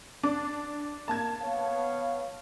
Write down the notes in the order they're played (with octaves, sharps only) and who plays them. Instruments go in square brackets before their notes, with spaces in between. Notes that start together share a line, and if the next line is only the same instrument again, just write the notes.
[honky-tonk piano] D4
[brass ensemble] A#3 [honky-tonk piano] A5 G#6
[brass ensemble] B3 C#5 F5